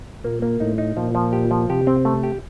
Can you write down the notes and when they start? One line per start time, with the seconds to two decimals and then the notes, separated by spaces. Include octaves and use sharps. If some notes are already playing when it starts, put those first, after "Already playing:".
0.24 A#2 A#3
0.42 A#3
0.60 A2 D#4
0.78 D#4
0.96 A#2 F3
1.15 F3
1.33 G4
1.51 F3
1.69 C3 G4
1.87 C4
2.05 A3
2.23 G4